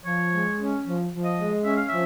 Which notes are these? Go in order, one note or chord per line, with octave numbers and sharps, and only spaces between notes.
F3 C#5
G#3
C#4
F3
F3
D#5
G#3
C#4 E5
F5
F3 E5